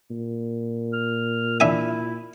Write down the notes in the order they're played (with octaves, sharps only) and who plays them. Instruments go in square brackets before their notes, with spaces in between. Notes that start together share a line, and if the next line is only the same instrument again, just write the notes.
[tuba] A#2
[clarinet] F6
[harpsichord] D4 E5 G#5 [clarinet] E4